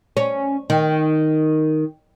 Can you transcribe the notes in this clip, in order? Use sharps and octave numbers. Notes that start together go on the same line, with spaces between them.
C#4
D#3